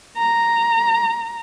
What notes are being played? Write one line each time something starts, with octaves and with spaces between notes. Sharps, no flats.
A#5